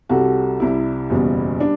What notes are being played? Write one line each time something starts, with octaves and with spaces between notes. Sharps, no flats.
C2 C3 G3 F#4 A4
C2 C3 G3 E4
F#1 E2 B2 G3
G3 D4